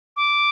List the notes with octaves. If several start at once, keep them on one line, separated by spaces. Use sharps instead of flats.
D6